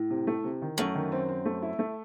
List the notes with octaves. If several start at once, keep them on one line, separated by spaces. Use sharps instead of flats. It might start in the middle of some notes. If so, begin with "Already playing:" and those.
Already playing: A2
C3
A3
C3
D#3
F#2 A3
D#3
C4
C4
A3
E4
A3